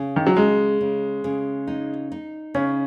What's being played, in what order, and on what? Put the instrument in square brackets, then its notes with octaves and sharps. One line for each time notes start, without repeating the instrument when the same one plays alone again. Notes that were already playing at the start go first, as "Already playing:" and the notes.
Already playing: [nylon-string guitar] C#3
[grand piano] D#3
F#3
[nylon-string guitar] C#3 [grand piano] G#3
[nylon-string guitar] C#3
C#3
D#4
D#4
[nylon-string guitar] C#3 [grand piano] C#4